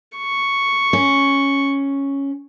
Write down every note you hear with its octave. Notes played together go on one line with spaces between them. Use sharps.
C#6
C#4